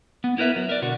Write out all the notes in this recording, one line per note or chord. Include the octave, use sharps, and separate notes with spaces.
B3
B3 E4 A#4 B4 E5
F#3
A#4 D5
B2 D3 F#4